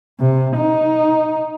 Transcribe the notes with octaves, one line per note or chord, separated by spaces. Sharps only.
C3
D#4